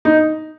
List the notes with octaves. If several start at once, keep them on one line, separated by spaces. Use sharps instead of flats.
D#4